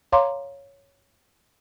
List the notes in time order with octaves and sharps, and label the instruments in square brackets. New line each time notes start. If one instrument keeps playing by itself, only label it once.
[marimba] C#5 F5 A#5 C6 D6